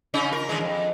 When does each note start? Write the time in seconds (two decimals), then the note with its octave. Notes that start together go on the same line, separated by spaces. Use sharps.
0.14 C#3 C#4 D#4
0.31 F4 A#4
0.49 D3 E3 G#3
0.61 F2